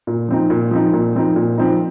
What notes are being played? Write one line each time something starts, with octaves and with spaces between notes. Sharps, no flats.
A#2
F3 C4 D#4
A#2
F3 C4 D#4
A#2
F3 C4 D#4
A#2
F3 C4 D#4